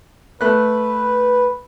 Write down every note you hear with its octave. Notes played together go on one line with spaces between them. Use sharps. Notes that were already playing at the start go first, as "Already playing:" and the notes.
A3 B4 F#6